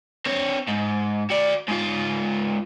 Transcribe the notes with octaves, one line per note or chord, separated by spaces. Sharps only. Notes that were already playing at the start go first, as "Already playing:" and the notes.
C4 C#5
G#2
F#4 D5
G#2 F4